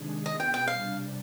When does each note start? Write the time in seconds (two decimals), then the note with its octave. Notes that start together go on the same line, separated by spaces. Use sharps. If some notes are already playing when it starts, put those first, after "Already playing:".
Already playing: C3 D#3 G#3 D4 G#4
0.26 B2 B3 F4 G#4 B4 D#5
0.40 G5
0.54 G5
0.67 C3 G3 D4 F5